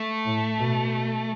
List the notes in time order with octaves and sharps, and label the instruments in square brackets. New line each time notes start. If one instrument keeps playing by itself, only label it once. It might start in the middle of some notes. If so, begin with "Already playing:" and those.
Already playing: [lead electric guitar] A3
[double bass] A2
B2